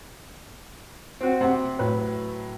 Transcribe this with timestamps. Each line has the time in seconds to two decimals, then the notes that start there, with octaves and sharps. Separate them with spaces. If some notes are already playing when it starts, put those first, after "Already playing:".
1.21 C4 F#4
1.41 C3 F#5
1.79 A2 F#3 B4